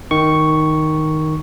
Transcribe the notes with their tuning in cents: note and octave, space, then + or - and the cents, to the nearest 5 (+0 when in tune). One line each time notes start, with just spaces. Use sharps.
D#3 +0 C#6 +0